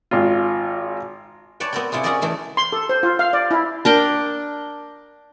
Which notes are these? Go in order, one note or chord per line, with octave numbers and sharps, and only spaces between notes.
G#1 F4
B4 C#5 D5 G5 A5
B3 C4 F#4 A#4 D5 G5
C3 E4 F4 G#4
C#4 F#4 G#4 A#4 D5 D#5
E3 A3 G#4
C6
A4
C5
F4
F5
D5
E4
D4 A#4 G5